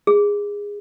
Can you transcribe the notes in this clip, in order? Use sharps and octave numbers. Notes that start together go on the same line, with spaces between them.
G#4